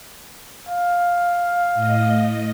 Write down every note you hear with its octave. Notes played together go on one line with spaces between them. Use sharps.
F5
A2 D#5